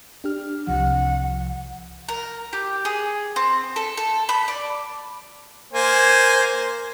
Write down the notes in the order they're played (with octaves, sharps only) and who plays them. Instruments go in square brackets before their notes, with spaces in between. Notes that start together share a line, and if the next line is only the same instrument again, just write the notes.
[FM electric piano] D4 G4 F6
[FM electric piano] C2 C3 F3 [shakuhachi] F#5
[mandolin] A#4
G4
G#4
C4
A4
A4
B5
D5
[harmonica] A#3 C5 G#5